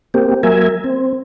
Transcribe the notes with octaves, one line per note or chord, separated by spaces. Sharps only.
A#3 C4 G4
F#3 A#3 A#4 E5 G#5
C4